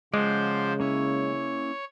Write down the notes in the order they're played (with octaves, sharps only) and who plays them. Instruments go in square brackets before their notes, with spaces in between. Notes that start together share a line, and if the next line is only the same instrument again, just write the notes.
[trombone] C#3 [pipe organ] F3 C5 [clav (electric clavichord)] G#3 [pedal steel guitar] D5 F#5
[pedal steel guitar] A#3 C#4 E4 [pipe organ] C#5